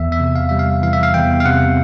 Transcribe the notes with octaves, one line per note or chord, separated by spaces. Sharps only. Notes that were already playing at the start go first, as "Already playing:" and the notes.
Already playing: E2 E5
E5
C3
F5
G3 E5
F5
E3 F5
E5
F5
E2 G5
F5
C3 F#5